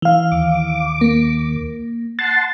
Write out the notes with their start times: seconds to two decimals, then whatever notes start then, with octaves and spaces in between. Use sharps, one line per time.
0.02 E3 F5
0.31 D#2 D6
1.01 A#3
2.19 F#5 A5 C6 A6